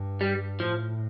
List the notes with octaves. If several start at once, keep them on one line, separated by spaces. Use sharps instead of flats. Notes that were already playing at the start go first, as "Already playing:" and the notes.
Already playing: G2
G3
A2 F3